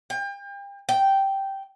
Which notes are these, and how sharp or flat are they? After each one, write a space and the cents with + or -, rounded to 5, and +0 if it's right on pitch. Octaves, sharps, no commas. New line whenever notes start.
G5 +35
G5 -5